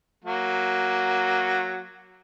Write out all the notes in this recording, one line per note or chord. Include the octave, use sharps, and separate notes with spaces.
F#3 A#3 F#4